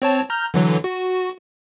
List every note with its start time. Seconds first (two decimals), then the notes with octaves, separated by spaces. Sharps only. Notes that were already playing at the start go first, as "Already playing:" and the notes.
0.02 C4 C#5 A5
0.30 A#5 F6 G6
0.54 D3 E3 F#3
0.84 F#4